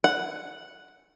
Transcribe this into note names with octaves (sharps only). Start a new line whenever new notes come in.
F#5